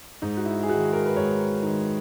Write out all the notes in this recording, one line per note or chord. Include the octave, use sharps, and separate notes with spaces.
G#2 D#4
F#4
E4
G#4
D#3 G#3 F#4
A#4
B4
G#2 C#5
D#3 G#3